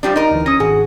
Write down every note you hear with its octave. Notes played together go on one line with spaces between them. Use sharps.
F3 G3 D4
D#4 A#4
D2 E3
C#4 D#6 A#6
G#1 F#4 G#4